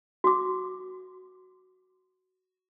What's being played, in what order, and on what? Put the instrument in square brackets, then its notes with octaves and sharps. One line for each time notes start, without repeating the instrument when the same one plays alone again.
[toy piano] F#4 D6